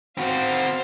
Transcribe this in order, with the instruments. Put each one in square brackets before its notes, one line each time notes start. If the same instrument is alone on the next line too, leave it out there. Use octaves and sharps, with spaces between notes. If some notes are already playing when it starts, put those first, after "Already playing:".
[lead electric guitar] C4 F#4 [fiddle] C5 F5